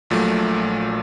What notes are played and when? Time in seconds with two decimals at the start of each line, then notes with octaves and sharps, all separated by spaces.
0.10 A#1 A#2 F#3 A3